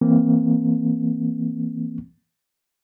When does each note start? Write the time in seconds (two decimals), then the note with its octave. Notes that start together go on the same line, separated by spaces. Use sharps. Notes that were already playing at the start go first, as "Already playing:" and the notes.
0.01 E3 A#3 C4